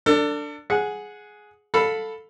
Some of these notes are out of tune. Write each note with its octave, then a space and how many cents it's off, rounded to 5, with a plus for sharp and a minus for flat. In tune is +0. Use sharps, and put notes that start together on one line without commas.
D4 +0 A4 +35
G#4 +10 F#5 -10
A4 +5 F5 +25 B5 +0